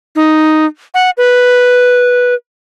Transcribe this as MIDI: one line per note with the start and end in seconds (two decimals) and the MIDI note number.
0.16 0.66 63
0.94 1.10 78
1.17 2.34 71